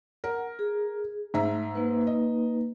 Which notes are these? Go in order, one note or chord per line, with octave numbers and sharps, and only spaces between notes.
A#4 F#5
G#4
G#2 A3 E5 A#5
A#3 D#4 B4
D#5